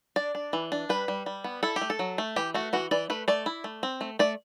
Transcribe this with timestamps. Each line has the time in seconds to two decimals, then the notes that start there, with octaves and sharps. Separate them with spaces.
0.16 D4 D5
0.35 D4
0.53 E3
0.72 D4
0.89 G3 B4
1.08 G3
1.26 G3
1.44 B3
1.63 E4 A4
1.76 G4
1.81 A3
1.90 A4
1.99 F#3
2.18 A3
2.36 E3 G4
2.54 A3 F#4
2.73 E3 F#4
2.91 E3 D5
3.10 A3 B4
3.28 A3 D5
3.46 E4
3.64 A3
3.83 C4
4.01 A3
4.19 A3 D5